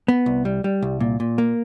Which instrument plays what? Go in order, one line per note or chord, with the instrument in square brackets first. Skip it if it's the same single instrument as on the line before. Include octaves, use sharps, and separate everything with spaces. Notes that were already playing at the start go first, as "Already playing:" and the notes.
[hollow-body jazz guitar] B3
C2
G3
G3
C2
A#2
A#2
A#3